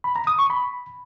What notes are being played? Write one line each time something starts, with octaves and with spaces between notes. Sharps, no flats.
B5
A#5
D#6
C#6
B5